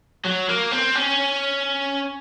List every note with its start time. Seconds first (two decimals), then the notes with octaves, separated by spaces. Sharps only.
0.25 F#3
0.49 A#3
0.71 C4
0.95 C#4